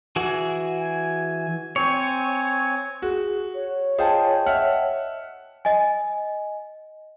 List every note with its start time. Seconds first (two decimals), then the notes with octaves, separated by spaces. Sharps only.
0.16 E3 F#4 G#4
0.81 G#5
1.76 C4 C#5 G#5
3.02 F#4 G#4
3.55 C#5
3.98 F4 G#4 C5 D#5 G5 A5
4.46 E5 F#5 F6
5.65 D#5 G#5